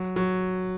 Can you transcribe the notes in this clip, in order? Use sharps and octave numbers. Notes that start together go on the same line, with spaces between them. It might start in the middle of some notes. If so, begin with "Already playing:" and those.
Already playing: F#3
F#3